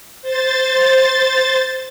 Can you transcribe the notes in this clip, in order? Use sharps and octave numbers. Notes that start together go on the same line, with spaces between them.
C5 A6